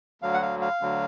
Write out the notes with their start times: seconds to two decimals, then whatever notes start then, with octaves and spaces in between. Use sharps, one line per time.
0.22 D2 D3 F#3 F5
0.34 F#5
0.42 F5
0.61 F5
0.81 D2 D3 F#3